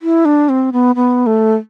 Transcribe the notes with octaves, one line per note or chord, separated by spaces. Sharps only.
E4
D4
C4
B3
B3
A3